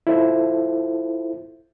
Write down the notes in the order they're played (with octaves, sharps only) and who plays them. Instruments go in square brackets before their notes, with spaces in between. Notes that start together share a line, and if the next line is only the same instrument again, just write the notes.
[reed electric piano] E4 F4 A4 C5 E5